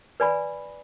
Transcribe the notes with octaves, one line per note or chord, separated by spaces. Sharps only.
B4 D5 G#5 B5